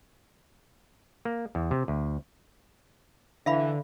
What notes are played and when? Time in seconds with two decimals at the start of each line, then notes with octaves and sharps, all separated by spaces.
1.25 A#3
1.55 E2
1.71 C3
1.88 D2
3.46 D3 E3 E5 F5 B5